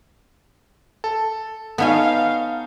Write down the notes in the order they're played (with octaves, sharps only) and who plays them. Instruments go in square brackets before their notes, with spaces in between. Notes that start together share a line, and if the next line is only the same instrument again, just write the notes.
[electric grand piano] A4
[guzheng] B3 C#5 G#5 [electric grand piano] D#4 A4 [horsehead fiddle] F5